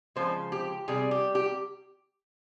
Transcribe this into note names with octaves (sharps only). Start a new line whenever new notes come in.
C#3 F3 G#3 C5
G4
C3 G3 G#4
G4
G4